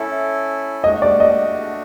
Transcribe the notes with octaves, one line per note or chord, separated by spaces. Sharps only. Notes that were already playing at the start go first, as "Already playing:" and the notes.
Already playing: C#4 E4 A4 E5
A3 D4 F#4 D#5
D5
D#5